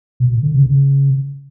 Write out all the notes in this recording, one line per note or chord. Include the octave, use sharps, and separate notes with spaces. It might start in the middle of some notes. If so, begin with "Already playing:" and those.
B2
A#2
D3
C#3
C#3